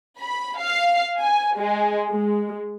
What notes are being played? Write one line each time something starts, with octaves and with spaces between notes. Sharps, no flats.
B5
F5
G#5
G#3
G#3